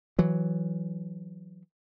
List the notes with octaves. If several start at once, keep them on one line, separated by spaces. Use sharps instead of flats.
E3 F#3